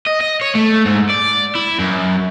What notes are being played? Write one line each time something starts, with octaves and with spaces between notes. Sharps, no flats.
D#5
D#5
C#5
A3
G#2
D5
E4
F#2